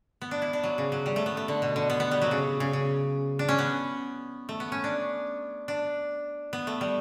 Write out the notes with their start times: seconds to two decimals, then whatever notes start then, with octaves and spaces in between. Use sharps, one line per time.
0.22 B3
0.31 D4
0.42 E4
0.53 D4
0.64 F#3
0.78 C#3
0.92 F#3
1.06 G3
1.16 A3
1.26 B3
1.37 A3
1.48 D3
1.62 B2
1.76 D3
1.90 B3
2.00 B3
2.11 G3
2.22 F#3
2.31 C#3
2.60 C#3
2.73 C#3
3.39 D4
3.49 C#4
3.59 B3
4.49 A3
4.60 B3
4.72 C#4
4.84 D4
5.68 D4
6.53 B3
6.67 A3
6.81 G3